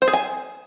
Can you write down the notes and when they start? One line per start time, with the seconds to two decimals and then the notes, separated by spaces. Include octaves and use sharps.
0.02 C5
0.08 G#4
0.13 G#5